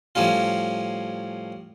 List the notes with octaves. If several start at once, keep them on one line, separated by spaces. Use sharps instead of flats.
A2 F3 G3 C#4 F4